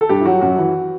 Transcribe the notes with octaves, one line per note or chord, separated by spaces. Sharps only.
A4
G2 G4
E4
F#3 F#4
F#2 F#4
E3